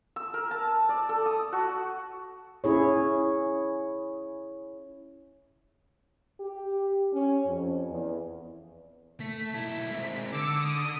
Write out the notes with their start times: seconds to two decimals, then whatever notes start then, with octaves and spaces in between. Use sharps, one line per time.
0.16 E6
0.34 A#4
0.51 A5
0.89 D5
1.09 A4
1.26 D#6
1.52 F#4
2.64 C#4 E4 G#4 C#5
6.41 G4
7.13 C#4
7.45 F2
7.91 E2
9.20 A3 B6
9.54 B1 E4
9.91 G#3 C4
10.32 D3 D6 E6 C#7
10.62 D#6 D7 D#7